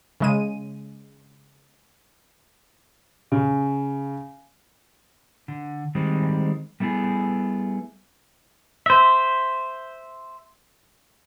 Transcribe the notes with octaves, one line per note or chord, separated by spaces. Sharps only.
C#3 G#3 D#7
C#3
D3
D#3 G3 G#3 C4
G3 A3 B3 E4 G#4
C5 E5